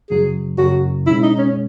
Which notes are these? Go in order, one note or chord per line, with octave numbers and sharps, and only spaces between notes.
F#2 C#3 F#3 G#4
F#2 C#3 F#3 F#4
B2 G#3 C#4 E4
D#4
C#4